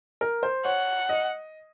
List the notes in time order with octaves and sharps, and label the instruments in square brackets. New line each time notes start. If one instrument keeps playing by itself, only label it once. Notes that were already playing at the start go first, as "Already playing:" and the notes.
[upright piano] A#4
C5
[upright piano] C#5 [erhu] F#5
[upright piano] D#5